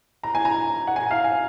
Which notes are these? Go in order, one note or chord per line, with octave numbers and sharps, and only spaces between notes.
A#5
G#5
A#5
F#5
G#5
F5
G#5